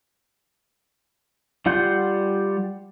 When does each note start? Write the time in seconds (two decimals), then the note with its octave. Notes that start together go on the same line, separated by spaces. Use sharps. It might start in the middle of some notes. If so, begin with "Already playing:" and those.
1.66 G3 F4 F#5 C6 G6